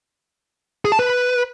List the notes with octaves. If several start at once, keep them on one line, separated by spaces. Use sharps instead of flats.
G#4
A5
B4